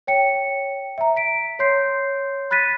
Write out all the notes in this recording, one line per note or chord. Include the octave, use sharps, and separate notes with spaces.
C#5 G5 C#7
E5 A#5
B6 D7
C#5 C6 G6 C7
B5 F#6 A6 B6 D#7